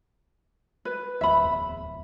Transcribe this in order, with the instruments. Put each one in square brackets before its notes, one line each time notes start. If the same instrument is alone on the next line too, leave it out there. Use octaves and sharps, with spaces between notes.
[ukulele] B4
[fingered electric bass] D1 D2 [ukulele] E5 B5
[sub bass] E2